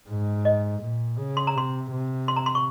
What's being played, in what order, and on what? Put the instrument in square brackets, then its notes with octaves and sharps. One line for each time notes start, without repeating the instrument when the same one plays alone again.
[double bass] G#2
[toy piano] D#5
[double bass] A#2
C#3
[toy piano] C6
A#5
[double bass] C3 [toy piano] C6
[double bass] C3
[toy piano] C6
A#5
C6
C#6